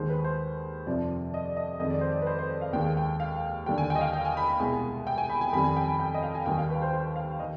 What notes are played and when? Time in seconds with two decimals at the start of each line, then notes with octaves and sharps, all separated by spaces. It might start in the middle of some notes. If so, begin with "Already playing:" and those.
Already playing: D#2 D#3 G#3 C5
0.09 B4
0.24 C5
0.86 F2 C3 F3 D5
1.34 D#5
1.45 D5
1.57 D#5
1.80 F2 D#3 G#3 D#5
1.90 D5
2.01 C5
2.12 D5
2.22 B4
2.27 C5
2.38 C5
2.61 F5
2.73 D#2 D#3 G#3 G5
2.97 G5
3.20 F5
3.66 D#2 D3 G3 G5
3.78 G#5
3.90 G5
3.95 D#5
4.01 F5
4.13 G5
4.25 G#5
4.37 B5
4.48 B5
4.59 C2 B2 G#3 G#5
5.07 G5
5.18 G#5
5.29 B5
5.41 G#5
5.53 F2 D#3 G3 B5
5.64 G#5
5.76 G5
5.87 G#5
6.00 G5
6.14 D#5
6.23 F5
6.35 G#5
6.46 D#2 D#3 G3 G5
6.58 F5
6.70 B4
6.82 C5
6.93 C5
7.16 F5
7.40 D#3 D#5